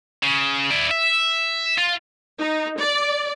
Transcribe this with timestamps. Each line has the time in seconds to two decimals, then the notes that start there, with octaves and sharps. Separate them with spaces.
0.23 C#3
0.71 E4 D5
0.91 E5
1.78 F4
2.39 D#4
2.78 D5